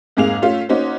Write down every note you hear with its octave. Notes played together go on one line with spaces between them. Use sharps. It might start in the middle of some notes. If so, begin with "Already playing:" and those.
F2 G#2 A#3 G#4 F5 F7
A3 C#4 F4
A#3 C#4 D#4 F#4 C5